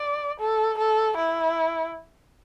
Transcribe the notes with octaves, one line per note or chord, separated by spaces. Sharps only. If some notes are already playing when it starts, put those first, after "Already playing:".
Already playing: D5
A4
A4
E4